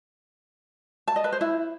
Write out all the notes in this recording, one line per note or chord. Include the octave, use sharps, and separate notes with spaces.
A5
D#5
B4
C5
E4